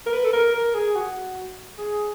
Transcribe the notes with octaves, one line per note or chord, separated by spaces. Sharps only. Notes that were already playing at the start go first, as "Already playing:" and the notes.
A#4
B4
A4
A#4
A#4
G#4
F#4
G#4